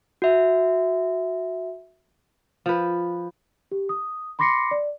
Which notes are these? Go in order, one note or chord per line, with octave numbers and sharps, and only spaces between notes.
F#4 E5
F3 B4
G4
D#6
B5 C6 D6 A#6 C7 C#7
D5